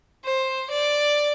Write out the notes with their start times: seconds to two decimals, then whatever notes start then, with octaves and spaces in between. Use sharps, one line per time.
0.24 C5
0.71 D5